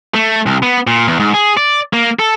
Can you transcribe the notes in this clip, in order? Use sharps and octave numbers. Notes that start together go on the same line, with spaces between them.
A3
C2
B3
A#2
E2
G#2
G#4
D5
A#3
A4